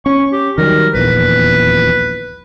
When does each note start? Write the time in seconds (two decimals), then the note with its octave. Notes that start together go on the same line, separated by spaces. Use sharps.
0.06 C#4 C#6
0.33 G4
0.58 D#3 F#3 G3 A#4
0.95 D#1 A#1 E2 B4